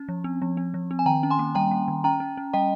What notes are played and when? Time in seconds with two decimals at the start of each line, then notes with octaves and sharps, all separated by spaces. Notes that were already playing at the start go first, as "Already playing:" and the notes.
Already playing: C#4
0.09 F3
0.24 C4
0.42 F3
0.57 C4
0.74 F3
0.91 C4
0.99 G#5
1.06 D#3 G5 A#5
1.23 C#4
1.30 G#5 C6
1.39 A#3
1.55 G3 G5 A#5
1.71 A#3
1.88 D#3
2.04 C#4 G5 A#5
2.20 C#4
2.37 C#4
2.53 G3 D#5 G5